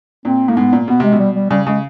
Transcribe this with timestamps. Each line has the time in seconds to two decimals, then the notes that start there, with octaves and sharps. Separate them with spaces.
0.25 A#2 C4
0.48 A2 A#3
0.56 G#2 B3
0.73 A#2
0.88 B2 B3
1.00 C3 G#3
1.12 B2
1.19 G3
1.35 G3
1.50 C#3 G3
1.67 C#3 G#3